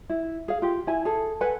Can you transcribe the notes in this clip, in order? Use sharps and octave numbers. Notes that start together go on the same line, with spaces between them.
E4
G#4 F5
F4 G4
E4 G#5
G#4 A4
A4 B4 F#5 G#5